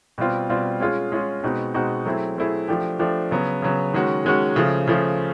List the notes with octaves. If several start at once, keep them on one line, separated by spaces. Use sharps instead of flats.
B2 G3 C4 F4
B2 G3 C4 F4
G#3 C#4 F4 G#4
G#3 C#4 F4 G#4
B2 G#3 C4 D#4 F#4
B2 G#3 C4 D#4 F#4
F#3 A3 C4 E4 G#4
F#3 A3 C4 E4 G#4
F3 A3 D4 G4
F3 A3 D4 G4
C#3 F#3 B3
C#3 F#3 B3
D#3 G#3 C#4 F#4
D#3 G#3 C#4 F#4
C#3 F3 A3
C#3 F3 A3